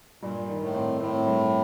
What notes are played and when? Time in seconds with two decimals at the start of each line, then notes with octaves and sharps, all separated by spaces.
0.22 G2 A#2
0.48 D#3
0.62 A2
0.75 C4
1.01 A2 C4
1.27 G2